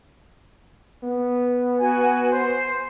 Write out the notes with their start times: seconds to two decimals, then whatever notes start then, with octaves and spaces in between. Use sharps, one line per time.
1.03 B3
1.78 F#4 G#5
2.30 C5